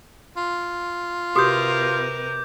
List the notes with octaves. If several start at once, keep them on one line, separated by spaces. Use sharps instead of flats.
F4
C3 F#4 G4 A#4 B4 D6 D#6 G6